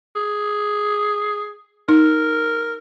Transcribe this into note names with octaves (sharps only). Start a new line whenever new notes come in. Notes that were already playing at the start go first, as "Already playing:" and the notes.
G#4
D#4 A#4